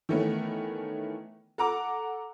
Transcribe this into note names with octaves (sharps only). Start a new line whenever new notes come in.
D#3 E3 A3 B3 C#4
A4 F#5 A#5 D6